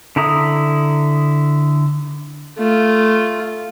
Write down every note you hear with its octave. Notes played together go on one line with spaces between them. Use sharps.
D3 E4 A#5 D#6
A3 F4